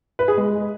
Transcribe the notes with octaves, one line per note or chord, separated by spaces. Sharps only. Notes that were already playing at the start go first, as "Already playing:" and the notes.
B4
G#4
G#3